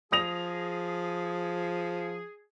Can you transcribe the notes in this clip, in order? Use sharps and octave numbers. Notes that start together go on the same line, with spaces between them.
F3 G#4 D#6 A#6 F7